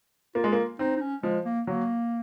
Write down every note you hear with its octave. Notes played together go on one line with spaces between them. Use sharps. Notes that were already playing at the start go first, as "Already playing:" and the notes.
A#3 F4
G#3
A#3
C4 D#4
D#4
C#4
F3 G#3
A#3
F#3 A#3